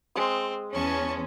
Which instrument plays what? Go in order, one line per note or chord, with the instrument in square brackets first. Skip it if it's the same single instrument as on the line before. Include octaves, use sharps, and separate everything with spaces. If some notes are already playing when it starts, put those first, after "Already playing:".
[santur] G#3 D#6 [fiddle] C4
[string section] E2 C#4 [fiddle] A5 C#6